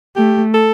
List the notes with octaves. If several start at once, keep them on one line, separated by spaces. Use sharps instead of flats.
A3 G4
A4